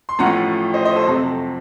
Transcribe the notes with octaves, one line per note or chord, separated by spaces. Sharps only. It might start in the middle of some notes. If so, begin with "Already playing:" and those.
C6
A1 A2 F3 A3 C#4 F#5 A#5
C5 D#5
C5 D#5
A4 C5
F2 C3 F#3 C4 A4